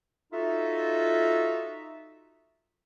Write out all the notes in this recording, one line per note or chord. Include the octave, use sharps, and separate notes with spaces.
D#4 F4 F#4 A4 E5